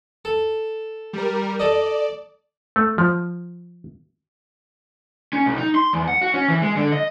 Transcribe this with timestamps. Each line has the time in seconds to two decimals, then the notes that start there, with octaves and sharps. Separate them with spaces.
0.25 A4
1.13 G3 A#4
1.59 A4 D5 D#5
2.76 A3
2.98 F3
5.33 C#4
5.46 B1
5.58 D#4
5.75 C6
5.93 E2
6.08 F#5
6.22 F#4
6.34 C#4
6.48 E3
6.62 G#3
6.76 D3
6.92 D#5